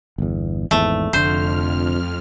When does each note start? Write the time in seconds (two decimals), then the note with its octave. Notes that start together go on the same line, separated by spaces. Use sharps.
0.18 G1 E2
0.71 G#1 E2 G#2 A3
1.13 F1 F2 D3 C5 F6